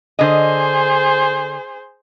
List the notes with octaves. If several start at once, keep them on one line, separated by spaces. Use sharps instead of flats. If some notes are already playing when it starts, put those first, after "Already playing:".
D3 G#4 C5 D#5